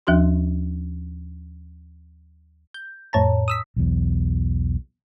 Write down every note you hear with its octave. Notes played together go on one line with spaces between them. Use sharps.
D#2 F3 D4 F#4 C6
G6
F2 A2 C#5 A5 A#5
D#6 E6 B6
B1 E2